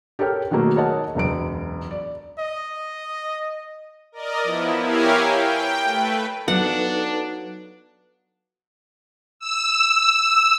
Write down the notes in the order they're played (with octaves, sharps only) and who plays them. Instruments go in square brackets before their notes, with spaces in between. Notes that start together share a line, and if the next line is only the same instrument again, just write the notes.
[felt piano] G4 A4 A#4 C#5 G5 F6
B2 D#3 F#3 A3 A#3
G#4 A#4 C#5 D#5 F#5 A5
E1 C#2 F#2 D7
D5
[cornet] D#5
[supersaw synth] A#4 D5 D#5
F3 B3 E4
E4 G4 A#4 C#5 F5 G#5
G5
A3 B4
[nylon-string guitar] F#3 B3 F4 [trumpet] D4 [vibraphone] D#4 A4 B4 [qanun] F#5
[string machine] E6